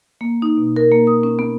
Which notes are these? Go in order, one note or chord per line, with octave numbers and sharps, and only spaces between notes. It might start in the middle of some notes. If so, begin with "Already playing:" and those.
A#3
D#4
B2
A#4
A#3
D#6
C#4
B3